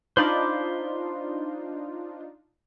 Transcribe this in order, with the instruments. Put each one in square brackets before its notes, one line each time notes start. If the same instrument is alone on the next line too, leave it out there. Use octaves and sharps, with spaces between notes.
[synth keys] D4 D#4 F4 [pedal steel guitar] C5 B5 D6